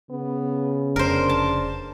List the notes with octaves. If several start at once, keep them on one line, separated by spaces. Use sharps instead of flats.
C#3 B3
F1 D4 A#4 C5
A5